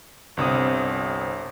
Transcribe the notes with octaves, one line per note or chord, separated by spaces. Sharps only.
G1 C2 C4 D#6